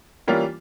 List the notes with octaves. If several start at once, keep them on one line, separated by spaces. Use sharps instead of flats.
E3 G3 A#3 C#4 F4